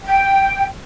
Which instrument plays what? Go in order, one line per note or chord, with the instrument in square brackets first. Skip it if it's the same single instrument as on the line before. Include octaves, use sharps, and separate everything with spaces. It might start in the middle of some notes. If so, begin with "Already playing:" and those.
[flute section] G5